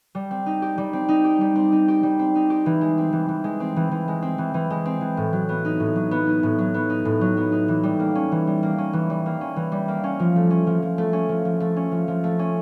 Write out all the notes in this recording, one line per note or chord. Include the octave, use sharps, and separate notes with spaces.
G3
C4
D#4
G4
G3
C4
D#4
G4
G3
C4
D#4
G4
G3
C4
D#4
G4
E3
G#3
C4
E3
E3
G#3
C4
E3
E3
G#3
C4
E3
E3
G#3
C4
E3
A2
F#3
B3
D#4
A2
F#3
B3
D#4
A2
F#3
B3
D#4
A2
F#3
B3
D#4
E3
G3
A#3
C#4
E3
G3
A#3
C#4
E3
G3
A#3
C#4
E3
G3
A#3
C#4
F3
A3
C#4
F3
F3
A3
C#4
F3
F3
A3
C#4
F3
F3
A3
C#4